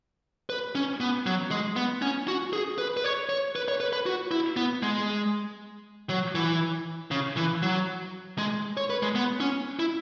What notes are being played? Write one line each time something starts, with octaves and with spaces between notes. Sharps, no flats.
B4
C#4
B3
F#3
G#3
B3
C#4
F#4
G#4
B4
B4
C#5
C#5
B4
C#5
B4
B4
F#4
E4
B3
G#3
F#3
E3
C#3
E3
F#3
G#3
C#5
B4
G#3
B3
C#4
E4